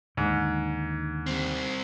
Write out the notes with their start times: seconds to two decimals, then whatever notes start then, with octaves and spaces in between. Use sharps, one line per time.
0.17 D#2 G#2 D3
1.27 G3 C4